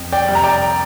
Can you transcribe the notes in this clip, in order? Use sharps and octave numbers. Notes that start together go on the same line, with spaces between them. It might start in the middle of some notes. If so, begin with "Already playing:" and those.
Already playing: F2
D5 G5
C3 G3
A#5
D5 G5